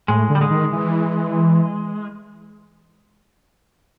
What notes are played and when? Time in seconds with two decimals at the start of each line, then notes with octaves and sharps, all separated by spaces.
0.08 A2 G#3
0.30 D3
0.35 G3
0.41 G#3
0.50 D#3
0.73 E3